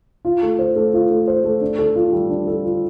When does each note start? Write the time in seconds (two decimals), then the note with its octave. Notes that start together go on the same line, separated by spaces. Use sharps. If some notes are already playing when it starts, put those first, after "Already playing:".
0.25 F4
0.42 A3
0.59 C5
0.76 A3
0.94 F4
1.10 A3
1.28 C5
1.44 A3
1.61 D4
1.79 A4
1.96 F4
2.12 G3
2.29 D4
2.47 A4
2.64 F4